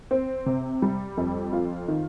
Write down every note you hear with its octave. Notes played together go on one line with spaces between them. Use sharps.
C4
C3
G3
F2
F4
D#3